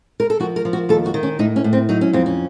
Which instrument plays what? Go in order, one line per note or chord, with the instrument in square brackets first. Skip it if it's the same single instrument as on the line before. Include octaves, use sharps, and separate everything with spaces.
[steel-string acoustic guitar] A#4
A4
F3 F#4
A#4
F3
F#4
D#2 A4
F#4
D#3
C#4
A2 D#4
C#4
A2
C4
F#3 D#4
C#4
F2 C4
C#4